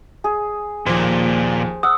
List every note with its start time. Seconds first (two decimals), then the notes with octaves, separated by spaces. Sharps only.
0.24 G#4
0.86 D#2 A#2 F3 C5
1.83 F#5 D#6 E6